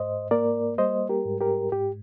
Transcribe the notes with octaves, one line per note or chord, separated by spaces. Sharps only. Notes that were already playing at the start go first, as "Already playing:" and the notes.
Already playing: G#2 C5 D#5
A#3 A#4 D5
G3 C5 D#5
G4 A#4
G#2
G4 A#4
G#2 G4